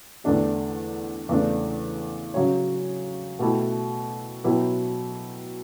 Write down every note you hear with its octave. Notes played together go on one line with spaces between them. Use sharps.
E2 D3 A3 D4 G4
E2 C#3 E3 A3 D4
C#3 F#3 C#4 F#4 C#5
B2 A3 E4 G4
B2 F#3 B3 E4 G4